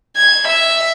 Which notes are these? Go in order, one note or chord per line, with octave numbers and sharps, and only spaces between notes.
G#6
E5